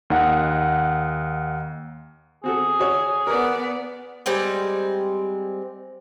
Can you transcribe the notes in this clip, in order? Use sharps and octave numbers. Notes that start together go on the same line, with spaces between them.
D#2 D#4 F#5
C4 F#4 G#4 A4
F#4 C#5 E6
B3 A#4 B4 D5
G3 G#3 C4 C5